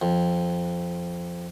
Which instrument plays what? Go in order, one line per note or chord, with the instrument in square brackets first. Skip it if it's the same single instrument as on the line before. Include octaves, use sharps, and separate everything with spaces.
[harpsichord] F2